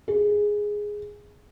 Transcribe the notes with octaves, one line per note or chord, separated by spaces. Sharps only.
G#4